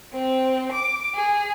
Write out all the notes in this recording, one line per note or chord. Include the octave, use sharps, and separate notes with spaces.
C4
D6
G#4